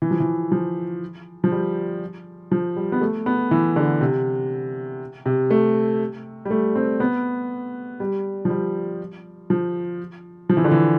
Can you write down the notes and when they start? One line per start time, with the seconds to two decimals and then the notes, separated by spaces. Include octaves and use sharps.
0.02 E3
0.11 F3
0.20 E3
0.52 F3
1.44 F3
1.52 G3
2.52 F3
2.76 G3
2.92 B3
3.01 A3
3.26 B3
3.51 E3
3.76 D3
4.01 C3
5.26 C3
5.51 A3
6.45 G3
6.51 A3
6.76 C4
7.00 B3
8.00 G3
8.45 F3
8.50 G3
9.50 F3
10.49 F3
10.57 E3
10.64 D3
10.71 E3